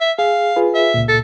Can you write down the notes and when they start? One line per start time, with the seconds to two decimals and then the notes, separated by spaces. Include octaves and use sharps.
0.01 E5
0.19 G#4 F5
0.56 F4 G#4 B4
0.75 E5
0.94 C#2 A#2
1.09 A4